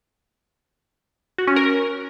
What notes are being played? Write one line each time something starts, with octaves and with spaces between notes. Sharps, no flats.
F#4
C#4
A#4